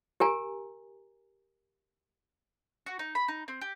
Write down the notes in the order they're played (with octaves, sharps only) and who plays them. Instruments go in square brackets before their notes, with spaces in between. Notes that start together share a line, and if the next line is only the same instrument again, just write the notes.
[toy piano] G4 A#4 G#5 A#5
[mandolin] F#4
D#4
B5
D#4
C4
G4